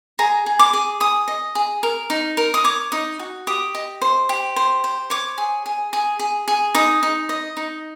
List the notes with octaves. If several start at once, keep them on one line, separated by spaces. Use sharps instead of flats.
G#4 A#5
G#4
D6
G#4
G#4 D#6
D#5
G#4
A#4
D#4
A#4
D#6
C#5 D6
D#4 D#6
F#4
G4 D#6
D#5
C5
G4
C5
C5
C#5 D6
G#4
G#4
G#4
G#4
G#4
D#4 D#6
D#4
D#5
D#4